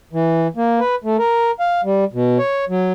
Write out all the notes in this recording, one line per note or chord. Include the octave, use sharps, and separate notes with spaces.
E3
A#3
B4
A3
A#4
F5
G3
B2
C#5
F#3